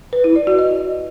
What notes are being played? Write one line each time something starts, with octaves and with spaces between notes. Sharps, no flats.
B4
E4
D5
F#4
D#5